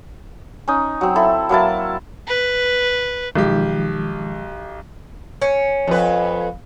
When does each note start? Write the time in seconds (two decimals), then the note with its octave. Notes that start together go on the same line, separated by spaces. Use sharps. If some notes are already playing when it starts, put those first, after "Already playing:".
0.68 C#4 D#4
1.01 F#3 C4
1.16 E4 A4
1.49 F#3 A#3 E4 A5
2.28 B4
3.35 B1 D#3 F3 G#3 G4
5.42 C#4
5.87 F2 B4